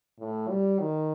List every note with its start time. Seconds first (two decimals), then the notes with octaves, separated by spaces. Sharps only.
0.19 A2
0.49 G3
0.80 D#3